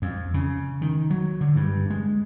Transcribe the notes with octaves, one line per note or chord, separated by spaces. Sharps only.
F2
C#3
D#3
F#3
D3
G2
G#3